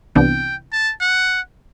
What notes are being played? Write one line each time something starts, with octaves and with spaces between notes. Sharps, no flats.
C2 C3 E3 B3 D4 G5
A5
F#5